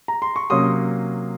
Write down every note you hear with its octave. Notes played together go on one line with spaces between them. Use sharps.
A#5
C6
C#6
C3 F#3 A#3 C#4 C6 D#6